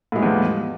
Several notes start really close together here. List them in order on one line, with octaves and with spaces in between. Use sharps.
A2 G#3 G3 E2 F3